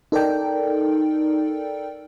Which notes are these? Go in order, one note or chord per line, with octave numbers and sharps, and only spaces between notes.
D#4 A4 A#4 D5 G5